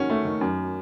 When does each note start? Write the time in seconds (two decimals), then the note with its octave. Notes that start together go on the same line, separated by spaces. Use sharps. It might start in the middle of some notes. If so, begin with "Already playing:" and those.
Already playing: D#3 C#4 F#4
0.10 A3
0.25 D#3
0.41 F#2